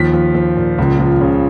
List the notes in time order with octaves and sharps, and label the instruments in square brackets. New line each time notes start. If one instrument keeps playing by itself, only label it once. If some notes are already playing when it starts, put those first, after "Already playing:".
Already playing: [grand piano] D#2 F3 B6
F3
F3
A#2
C#2
F3
C#3